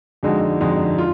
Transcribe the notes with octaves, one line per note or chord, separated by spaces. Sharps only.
F2 D3 G#3 D#4 F#4
F2 D3 G#3 D#4 F#4
F4